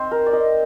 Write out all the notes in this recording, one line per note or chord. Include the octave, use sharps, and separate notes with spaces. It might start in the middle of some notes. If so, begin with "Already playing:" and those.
Already playing: C4 D#4 C5
A#4
D5
D#5